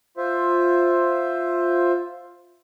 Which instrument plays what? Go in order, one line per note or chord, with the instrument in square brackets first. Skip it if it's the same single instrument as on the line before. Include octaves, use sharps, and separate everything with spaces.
[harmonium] F4 C5 E5